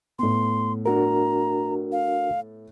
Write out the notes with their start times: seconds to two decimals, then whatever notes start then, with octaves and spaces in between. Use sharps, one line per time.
0.19 A2 B3 C6
0.86 D4 F#4 A#4 A#5
1.92 F5